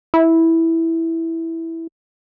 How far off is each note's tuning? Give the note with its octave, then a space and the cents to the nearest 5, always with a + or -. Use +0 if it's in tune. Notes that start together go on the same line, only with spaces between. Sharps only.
E4 -5